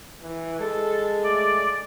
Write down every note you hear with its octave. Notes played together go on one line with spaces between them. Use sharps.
E3
G#3 A4
A3 D5